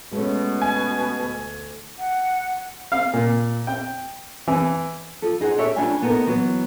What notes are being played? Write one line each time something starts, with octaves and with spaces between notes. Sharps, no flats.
B2 G#3 A3 C#4
G#5
D2
F#5
F5
A#2
G5
E3
F3 A4
D#4 G#4 C5 F#5
G4 A4 C#5 D5 E5
F2 C#4 D4 B4 F5 G#5
B3 D#4 A4 A#4 C5
E3 F#3 B3